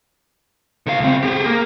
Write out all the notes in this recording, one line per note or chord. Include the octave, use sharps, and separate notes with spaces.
D3 F5
C#2 C4
G4 G#4
A#3 A#4